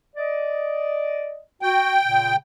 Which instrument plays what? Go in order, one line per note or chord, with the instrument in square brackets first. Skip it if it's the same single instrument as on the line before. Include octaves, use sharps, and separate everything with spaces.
[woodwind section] D5 D#5
[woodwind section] F#4 [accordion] G5
[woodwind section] A#2 C#3